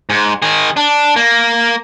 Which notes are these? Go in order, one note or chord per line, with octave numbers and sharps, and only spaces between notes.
G#2
D#3 G#4
D4
A#3